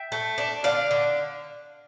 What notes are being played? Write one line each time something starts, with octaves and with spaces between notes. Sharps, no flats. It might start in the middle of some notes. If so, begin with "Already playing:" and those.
Already playing: E5 G5
A3
D4
D3 D5 F5
D3